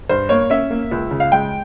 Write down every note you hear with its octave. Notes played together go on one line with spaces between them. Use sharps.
G2 C5
A#3 C#5
C#4 E5
A#3
C#2
C#3
F5
G#3 G5